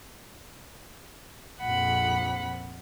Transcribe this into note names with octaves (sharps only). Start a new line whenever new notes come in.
A#1 F2 F#5 B5